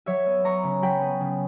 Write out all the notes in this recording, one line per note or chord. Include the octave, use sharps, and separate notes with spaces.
F#3 C#5 E5
B3
B3 A#5 C#6
C#3
F#3 G5 B5
B3
C#3